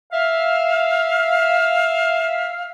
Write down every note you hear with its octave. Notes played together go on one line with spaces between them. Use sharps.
E5 F5